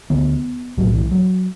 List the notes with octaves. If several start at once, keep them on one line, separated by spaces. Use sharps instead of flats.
D2 D3 B3
B1 A2 F#3
E3
F#3